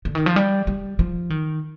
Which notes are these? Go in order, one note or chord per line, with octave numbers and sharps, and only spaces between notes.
D3
D#3
F3
G3
G3
F3
D#3